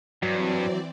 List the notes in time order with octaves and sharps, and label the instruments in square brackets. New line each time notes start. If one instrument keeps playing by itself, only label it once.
[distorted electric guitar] G2 [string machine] E3 C4 D5 [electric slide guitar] F#3